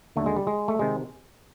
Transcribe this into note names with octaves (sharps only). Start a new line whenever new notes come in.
D#2 D3 F#3 A3
G#3
G3
G#3
A3
C3 D#3 G#3